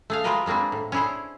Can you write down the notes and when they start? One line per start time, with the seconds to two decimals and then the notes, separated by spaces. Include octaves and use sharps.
0.10 A3 G#4 F5
0.24 G#3 F4 G4 A#4 B4 D#5
0.46 G3 G#3 A#3 C4 D4
0.72 A2
0.92 C#4 D4 E4 G#4 C5